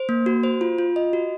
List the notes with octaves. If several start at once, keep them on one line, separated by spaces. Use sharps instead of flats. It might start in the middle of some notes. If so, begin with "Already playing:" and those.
Already playing: C5
A#3
F#4
C5
F4
F4
D#5
F#4